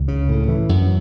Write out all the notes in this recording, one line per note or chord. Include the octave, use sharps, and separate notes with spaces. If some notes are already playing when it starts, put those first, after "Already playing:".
Already playing: C#2
C#3
A2
E3
F#2